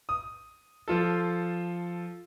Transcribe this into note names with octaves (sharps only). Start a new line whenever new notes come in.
D#6
F3 F4 A4